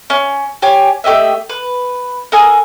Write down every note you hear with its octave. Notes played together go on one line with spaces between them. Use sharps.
C#4
G4 C#5 G#5
A3 G4 D#5 E5
B4
A4 A#4 G#5 D#6